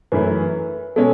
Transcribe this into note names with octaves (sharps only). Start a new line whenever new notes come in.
F#2 E3 A3 E4 B4
B2 G#3 C#4 A4